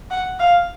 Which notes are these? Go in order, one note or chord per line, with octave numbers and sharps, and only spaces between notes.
F#5
F5